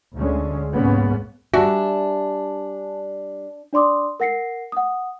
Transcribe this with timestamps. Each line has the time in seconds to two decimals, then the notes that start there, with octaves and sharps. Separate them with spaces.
0.16 D2 D3 G#3 C#4
0.71 C2 G#2 G#3 A#3 B3 C#4
1.54 G3 D4 F#4 E5 G#5 A5
3.73 D4 D5 C6 D6 D#6
4.20 A#4 F#5 A#6 C7 C#7
4.72 F#5 D#6